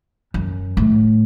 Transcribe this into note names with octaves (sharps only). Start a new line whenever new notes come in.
F#2
A2